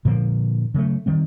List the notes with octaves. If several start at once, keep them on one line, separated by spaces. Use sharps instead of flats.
A#2 D3 F3 A#3
C#3 F#3 G3 A3
D#3 G3 C4